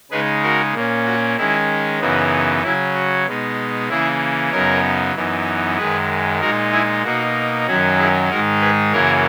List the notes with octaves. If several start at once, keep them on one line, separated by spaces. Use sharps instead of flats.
C#3 G#3 D#4 G#4 B4
F#4 A#4
A#2 A#3 C#4
F#4
D#3 G#3 C#4 E4
F#2 C#3 E3 B3 D#4 F#4
C#3 F#3 C#4 E4
F#4
B2 G#3 B3 D#4
C#3 E3 A#3 C#4 E4 G#4
F#2 C#3 F#3 B3 D#4 A#4 C#5
F#2 E3 B3 D#4
F#2 D#3 G#3 G#4 B4
A#2 G#3 D#4 F#4 A#4
E4 G#4
B2 A#3 D#4 F#4
F#2 D#3 F#3 C#4 F#4
E4 G#4
G#2 D#3 G#3 D#4 F#4 A#4
G#4 B4
F#2 C#3 E3 A#3 C#4 A#4 C#5